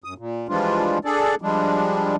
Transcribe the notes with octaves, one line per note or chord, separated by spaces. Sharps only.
F#2 D#6
A#2
E3 F3 G3 G#3 D4 F4
D4 G#4 A4 D5
F3 G3 G#3 D4